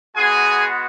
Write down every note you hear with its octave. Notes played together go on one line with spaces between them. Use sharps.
G#3 B3 F#4 G#4 G#5